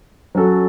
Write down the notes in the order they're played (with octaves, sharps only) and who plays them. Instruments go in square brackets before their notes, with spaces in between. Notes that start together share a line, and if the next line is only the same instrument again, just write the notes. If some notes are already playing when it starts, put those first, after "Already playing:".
[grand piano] F#3 C#4 F#4 A4